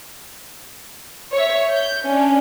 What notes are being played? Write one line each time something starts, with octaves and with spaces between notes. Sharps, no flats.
C#5 E5
G6
C#4 D4